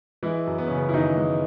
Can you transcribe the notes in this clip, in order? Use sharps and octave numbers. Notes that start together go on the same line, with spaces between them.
E3 G#3 E4
F#2
B3
C#3 C#4
B3
E4
F#2 D#3 D#4
G#3